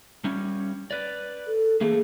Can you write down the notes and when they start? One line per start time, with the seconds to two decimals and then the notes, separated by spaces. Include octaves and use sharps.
0.24 G3 C#4
0.91 B4 D5
1.47 A4
1.81 E3 A3 A#3 G#4